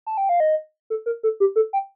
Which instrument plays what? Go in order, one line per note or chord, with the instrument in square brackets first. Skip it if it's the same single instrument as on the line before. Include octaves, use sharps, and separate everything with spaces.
[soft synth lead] A5
G5
F5
D#5
A4
A#4
A4
G4
A4
G5